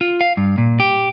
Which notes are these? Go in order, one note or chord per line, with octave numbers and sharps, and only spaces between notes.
F4
F5
G2
A#2
G4